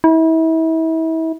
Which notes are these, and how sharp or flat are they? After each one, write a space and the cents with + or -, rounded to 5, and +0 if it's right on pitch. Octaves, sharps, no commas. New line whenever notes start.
E4 -35